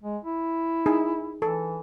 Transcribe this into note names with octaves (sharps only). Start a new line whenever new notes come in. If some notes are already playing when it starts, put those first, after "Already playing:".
G#3
E4
D#4 G#4
E3 A4